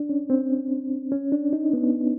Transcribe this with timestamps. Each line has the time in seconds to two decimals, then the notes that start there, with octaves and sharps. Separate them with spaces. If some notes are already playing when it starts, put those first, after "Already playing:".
Already playing: D4
0.09 C#4
0.30 C4
1.12 C#4
1.32 D4
1.53 D#4
1.73 B3